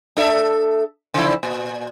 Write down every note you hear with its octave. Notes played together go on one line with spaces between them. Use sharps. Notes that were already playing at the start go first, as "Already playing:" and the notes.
D4 A4 E5
C#3 F3 E4
A#2